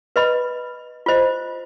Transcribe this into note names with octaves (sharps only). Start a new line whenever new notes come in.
B4 D#5 B5
F4 C5 D#5